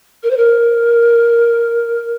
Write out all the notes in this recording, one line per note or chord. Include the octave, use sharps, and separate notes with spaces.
A#4
C5
A#4